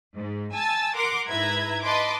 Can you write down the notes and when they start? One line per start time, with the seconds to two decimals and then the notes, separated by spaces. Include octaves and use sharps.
0.16 G#2
0.53 G#5 A5 E6 A6
0.95 A#4 F#5 C6 D6
1.27 G#2 E4 B4 E5 A#5 G#6
1.84 B4 D#5 A5 C6 D6